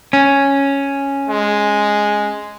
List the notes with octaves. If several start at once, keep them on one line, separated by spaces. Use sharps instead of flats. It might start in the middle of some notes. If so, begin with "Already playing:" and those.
C#4
G#3